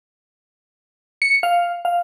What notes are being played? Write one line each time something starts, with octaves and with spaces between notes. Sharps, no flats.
C#7
F5
F5